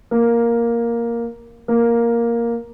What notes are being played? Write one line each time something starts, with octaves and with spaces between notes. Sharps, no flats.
A#3
A#3